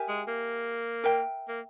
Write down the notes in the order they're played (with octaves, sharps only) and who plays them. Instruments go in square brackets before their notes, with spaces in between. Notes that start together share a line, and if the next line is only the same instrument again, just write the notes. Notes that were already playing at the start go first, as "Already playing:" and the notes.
Already playing: [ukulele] G4 A#4 E5 G#5
[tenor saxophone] G#3
A#3
[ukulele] A#4 E5 G5
[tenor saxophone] A#3